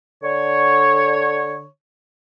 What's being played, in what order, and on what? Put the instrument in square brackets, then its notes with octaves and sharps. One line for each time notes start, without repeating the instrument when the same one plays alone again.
[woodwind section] D3 C#5